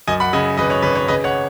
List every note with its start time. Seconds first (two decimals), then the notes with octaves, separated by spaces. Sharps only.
0.08 F#2 D#5 G#5
0.20 F#5 B5
0.33 C#3 D#5 G#5
0.57 G#1 B4 D#5
0.70 C#5
0.82 G#1 B4
0.95 C#5
1.08 C#3 B4 D#5
1.24 C#5 F#5